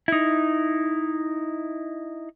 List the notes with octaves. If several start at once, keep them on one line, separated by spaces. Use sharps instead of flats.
D#4 E4